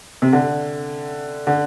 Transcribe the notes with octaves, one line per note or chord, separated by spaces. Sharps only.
C3
D3
D3